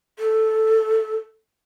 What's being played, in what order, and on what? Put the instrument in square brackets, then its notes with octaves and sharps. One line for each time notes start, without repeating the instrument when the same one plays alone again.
[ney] A4